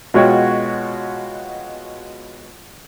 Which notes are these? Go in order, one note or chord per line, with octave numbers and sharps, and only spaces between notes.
B2 G#3 F4 F#4 C#5 G5